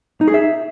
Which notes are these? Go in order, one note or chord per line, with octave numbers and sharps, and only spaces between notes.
D#4
G#4
E5